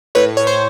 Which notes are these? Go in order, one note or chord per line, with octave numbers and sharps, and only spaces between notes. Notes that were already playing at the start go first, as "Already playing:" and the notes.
A2 B4 C#5
A2 C#5
C5